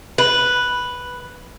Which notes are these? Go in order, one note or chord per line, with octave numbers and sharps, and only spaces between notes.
B4